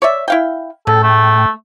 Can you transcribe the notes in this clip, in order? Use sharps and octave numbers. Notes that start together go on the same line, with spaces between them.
C#5 D5 E5
E4 F5 G5
A2 C#3 A4 G5
A3